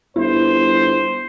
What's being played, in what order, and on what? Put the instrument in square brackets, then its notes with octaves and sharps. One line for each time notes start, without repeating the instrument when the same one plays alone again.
[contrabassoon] G1 [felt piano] E4 [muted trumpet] C5